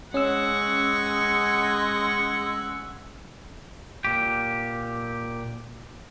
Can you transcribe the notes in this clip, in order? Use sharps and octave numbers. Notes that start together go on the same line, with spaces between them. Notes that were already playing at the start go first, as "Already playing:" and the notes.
G#3 C#4 F#5 C#6 E6
A#2 G4